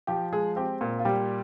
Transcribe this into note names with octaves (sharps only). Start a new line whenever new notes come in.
F3 G4
G#3 G#4
C4 G4
A#2
F4
G3 G4